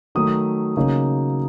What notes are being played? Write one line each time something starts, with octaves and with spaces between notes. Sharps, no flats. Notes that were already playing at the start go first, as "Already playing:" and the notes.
D#3 F#3 A3 D#6
C#3 F#3 A#3 D#4